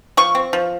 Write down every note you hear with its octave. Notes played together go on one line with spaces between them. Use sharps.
F3 C#6
C4
F3